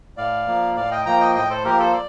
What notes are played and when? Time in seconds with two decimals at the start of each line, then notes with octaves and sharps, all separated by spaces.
0.17 A2 D5 F5
0.47 F3 A#3
0.76 A2 D5 F5
0.91 D#5 G5
1.06 F3 A#3 G5 A#5
1.20 D#5 G5
1.35 A2 D#5 G5
1.50 A4 C5
1.65 F3 A#3 G4 A#4
1.79 A4 C5
1.93 D5